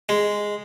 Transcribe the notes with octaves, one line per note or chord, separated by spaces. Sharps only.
G#3